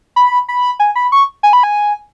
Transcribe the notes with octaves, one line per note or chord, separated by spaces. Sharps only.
B5
B5
G#5
B5
C#6
G#5
B5
G#5